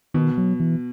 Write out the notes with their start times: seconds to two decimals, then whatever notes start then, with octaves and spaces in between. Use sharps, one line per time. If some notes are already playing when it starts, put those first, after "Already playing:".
0.14 B2 D#3
0.38 F#3
0.60 E3